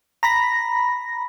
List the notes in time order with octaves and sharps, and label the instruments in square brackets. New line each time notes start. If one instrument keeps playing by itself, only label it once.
[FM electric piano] A#5 B5 A#6